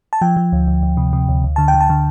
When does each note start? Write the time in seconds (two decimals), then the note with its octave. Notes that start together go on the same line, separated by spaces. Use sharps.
0.13 A5
0.21 F3 G5
0.37 F3
0.52 D2
0.68 D2
0.83 D2
0.97 C3
1.13 C3
1.28 D2
1.44 D2
1.56 D3 A5
1.68 G5
1.74 D3
1.81 A5
1.90 D3